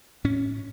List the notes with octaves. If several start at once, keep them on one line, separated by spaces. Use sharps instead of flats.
A2 C#4